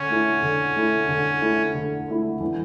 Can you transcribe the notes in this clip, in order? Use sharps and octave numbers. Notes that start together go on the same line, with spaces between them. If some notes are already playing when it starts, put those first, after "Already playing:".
Already playing: D3 C#4
A3 E4
D3
A3 E4
D3
A3 E4
D3
A3 E4
E3